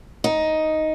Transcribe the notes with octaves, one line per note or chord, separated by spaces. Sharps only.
D#4